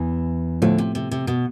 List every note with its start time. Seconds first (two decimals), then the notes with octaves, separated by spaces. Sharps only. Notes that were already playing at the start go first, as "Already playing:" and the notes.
Already playing: E2 E3
0.62 D2 A2 D3 F3 A3
0.78 C3
0.95 C3
1.11 C3
1.27 B2